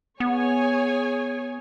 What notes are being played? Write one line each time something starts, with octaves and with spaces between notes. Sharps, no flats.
B3 G#4 C#5 G#5